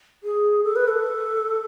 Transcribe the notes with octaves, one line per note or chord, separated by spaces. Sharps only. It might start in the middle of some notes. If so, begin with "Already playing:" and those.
G#4
A4
B4
A4